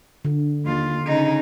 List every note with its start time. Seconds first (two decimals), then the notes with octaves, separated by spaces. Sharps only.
0.25 D3
0.65 D#2 F4
1.05 C#3 D#4